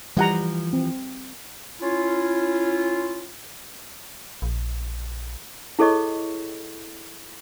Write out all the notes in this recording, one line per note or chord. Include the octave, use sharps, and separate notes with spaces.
E3 F3 G3 F#5 A#5
C4
C#4 E4 F4
A#1
E4 G#4 A4 C#5 D#5 C#6